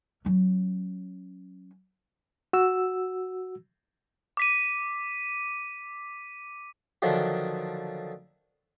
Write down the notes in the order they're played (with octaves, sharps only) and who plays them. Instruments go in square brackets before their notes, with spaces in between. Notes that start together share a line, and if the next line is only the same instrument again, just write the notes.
[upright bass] F#3 C#4
[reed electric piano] F#4 E6
[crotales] D6 B6 D#7
[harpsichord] D3 D#3 F3 F#3